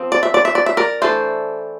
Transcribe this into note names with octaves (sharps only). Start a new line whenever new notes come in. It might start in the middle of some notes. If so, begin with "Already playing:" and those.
Already playing: F3 C4
D5
E5
D5
E5
D5
E5
A#4 D5
E3 A3 D4 A4 C5